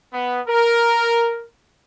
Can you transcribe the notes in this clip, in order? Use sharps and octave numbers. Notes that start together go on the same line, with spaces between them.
B3
A#4